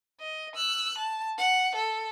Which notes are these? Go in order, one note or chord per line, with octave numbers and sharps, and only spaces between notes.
D#5
E6 F#6
A5
F#5
A4